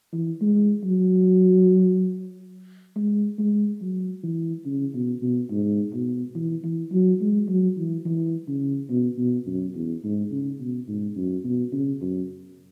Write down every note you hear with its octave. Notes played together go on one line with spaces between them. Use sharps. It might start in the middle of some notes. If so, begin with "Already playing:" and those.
E3
G#3
F#3
G#3
G#3
F#3
E3
C#3
B2
B2
G#2
B2
E3
E3
F#3
G#3
F#3
E3
E3
C#3
B2
B2
F#2
E2
G#2
C#3
B2
G#2
F#2
B2
C#3
F#2